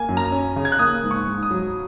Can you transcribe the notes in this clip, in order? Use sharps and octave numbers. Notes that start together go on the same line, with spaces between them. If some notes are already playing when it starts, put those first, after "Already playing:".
Already playing: A#3 G#5
F#2
A#5
C#4
C#3
G#6
F#6
A#3 D#6
G#2
C#6
G#2
D#6
F#3